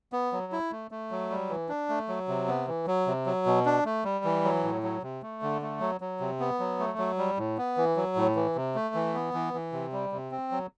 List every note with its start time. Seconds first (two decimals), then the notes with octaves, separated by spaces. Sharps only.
0.12 B3
0.32 F#3
0.52 E4
0.71 A3
0.91 A3
1.11 F#3
1.30 G3
1.49 E3
1.69 D4
1.89 A3
2.08 F#3
2.28 C3
2.48 B3
2.68 E3
2.87 F#3
3.07 C3
3.26 F#3
3.46 B2
3.65 D4
3.85 A3
4.04 G3
4.24 E3
4.44 F#3
4.64 A2
4.83 F#3
5.03 C3
5.22 A3
5.42 D3
5.62 A3
5.81 F#3
6.01 F#3
6.20 C3
6.40 B3
6.59 F#3
6.79 A3
6.98 F#3
7.18 G3
7.37 A2
7.57 B3
7.77 E3
7.96 F#3
8.16 A2
8.36 E3
8.56 C3
8.75 A3
8.95 E3
9.14 B3
9.34 E3
9.54 E3
9.72 C3
9.92 G3
10.12 C3
10.31 C4
10.52 F#3